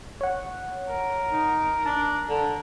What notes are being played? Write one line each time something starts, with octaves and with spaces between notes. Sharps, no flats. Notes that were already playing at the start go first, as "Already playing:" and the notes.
C#5 F#5
A#4
D#4
D4 A5
D3